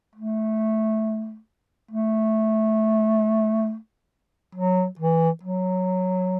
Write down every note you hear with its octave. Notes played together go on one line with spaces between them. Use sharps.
A3
A3
F#3
E3
F#3